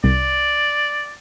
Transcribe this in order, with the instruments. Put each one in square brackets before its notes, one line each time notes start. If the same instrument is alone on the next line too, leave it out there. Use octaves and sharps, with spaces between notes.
[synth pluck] C2 [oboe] D5